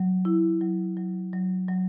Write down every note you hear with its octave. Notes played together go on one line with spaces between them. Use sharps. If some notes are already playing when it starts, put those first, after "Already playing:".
Already playing: F#3
E4
F#3
F#3
F#3
F#3